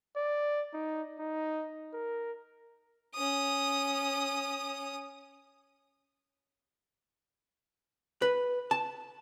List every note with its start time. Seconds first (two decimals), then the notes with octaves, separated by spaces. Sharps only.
0.17 D5
0.74 D#4
1.20 D#4
1.94 A#4
3.14 C#4 D#6
8.22 B4
8.71 A5